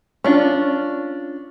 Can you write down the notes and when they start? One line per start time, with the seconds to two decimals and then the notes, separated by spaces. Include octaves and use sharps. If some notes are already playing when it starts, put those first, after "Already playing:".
0.24 C#4 D4 F4